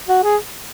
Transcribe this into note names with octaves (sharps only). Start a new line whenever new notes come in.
F#4
G#4